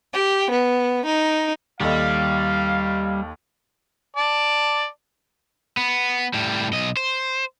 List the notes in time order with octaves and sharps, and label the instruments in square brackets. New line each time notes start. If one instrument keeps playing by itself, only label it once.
[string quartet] G4
B3
D#4
[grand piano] D#2 A4 D#5 [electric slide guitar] G3 [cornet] F5
[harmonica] D5 A5
[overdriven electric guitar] B3
A2 G3
B1 D#5
C5